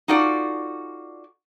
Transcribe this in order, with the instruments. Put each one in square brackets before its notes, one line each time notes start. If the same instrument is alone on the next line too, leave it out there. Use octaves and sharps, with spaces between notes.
[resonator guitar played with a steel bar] D#4 F4 F#4 A4 D5